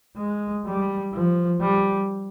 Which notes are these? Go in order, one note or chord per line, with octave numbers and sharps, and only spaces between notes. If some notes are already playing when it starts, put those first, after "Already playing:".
G#3
G3
F3
G3